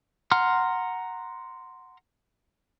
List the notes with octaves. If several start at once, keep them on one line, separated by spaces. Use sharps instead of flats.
F#5 A#5 C6 F6